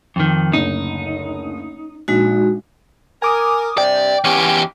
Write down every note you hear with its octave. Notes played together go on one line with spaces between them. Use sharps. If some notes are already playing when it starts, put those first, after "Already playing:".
F2 D#3
F#1 D2 D#4
A#1 G#3 D#4 F#4
A#4 G#5 D6 D#6
G2 C3 D5 G5
E2 B3 C#4 G4